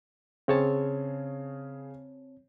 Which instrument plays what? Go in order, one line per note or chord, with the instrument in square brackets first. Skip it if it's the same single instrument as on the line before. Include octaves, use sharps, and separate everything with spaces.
[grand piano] C#3 G#4 [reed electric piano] C4 C#5 A5